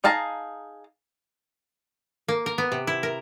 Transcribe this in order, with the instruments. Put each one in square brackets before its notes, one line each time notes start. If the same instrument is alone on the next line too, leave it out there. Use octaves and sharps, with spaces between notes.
[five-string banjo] D#4 G#4 F5 A5 A#5
[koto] A#3
A#4
B3
C3
E4
A#4